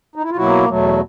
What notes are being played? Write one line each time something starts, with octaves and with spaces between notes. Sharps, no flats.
D#4
E4
F4
B2 F#3 A#3 E4 F#4
E2 B2 F#3 A3